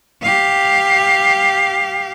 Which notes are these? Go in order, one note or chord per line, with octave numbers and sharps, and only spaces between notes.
G4 F5